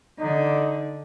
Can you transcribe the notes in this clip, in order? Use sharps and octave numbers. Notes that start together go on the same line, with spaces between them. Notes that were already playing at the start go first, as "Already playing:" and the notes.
D3 D#4